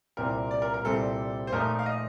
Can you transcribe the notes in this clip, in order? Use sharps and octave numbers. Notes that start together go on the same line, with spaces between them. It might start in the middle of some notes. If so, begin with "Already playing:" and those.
C2 A#2 G3 C4 A#4
D5
A#4
A#4
C2 A#2 G3 C4 G4 A4
C5
A#2 F3 A3 D#4 A#4
F5
D#5